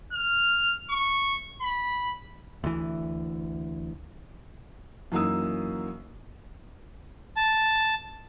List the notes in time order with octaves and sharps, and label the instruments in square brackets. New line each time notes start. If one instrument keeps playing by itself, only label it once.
[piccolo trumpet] F6
C#6
B5
[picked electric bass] D2 E3
[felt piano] F#2 E3 A#3 D#4 D#6 E6
[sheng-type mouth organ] A5